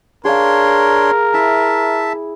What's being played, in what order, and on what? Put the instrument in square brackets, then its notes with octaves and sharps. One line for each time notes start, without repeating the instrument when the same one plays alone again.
[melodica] D4 C#5 C6 [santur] G#4 F5 [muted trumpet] A#4
[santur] E4 [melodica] E5 A5